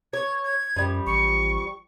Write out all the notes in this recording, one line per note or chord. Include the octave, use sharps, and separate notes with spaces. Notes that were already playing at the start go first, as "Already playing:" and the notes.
C#5 G#6
G#6
F#2 F3 G3
A1 C#6